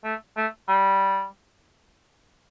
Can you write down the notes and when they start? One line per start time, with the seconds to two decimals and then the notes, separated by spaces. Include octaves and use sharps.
0.05 A3
0.37 A3
0.68 G3